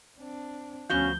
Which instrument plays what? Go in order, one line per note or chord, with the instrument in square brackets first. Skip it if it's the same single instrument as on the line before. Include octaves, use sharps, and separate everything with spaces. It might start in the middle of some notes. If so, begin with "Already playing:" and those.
[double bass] C4 D4
[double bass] D2 F3 [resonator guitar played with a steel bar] B3 F#4 F5 [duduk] C#4 [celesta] G6 G7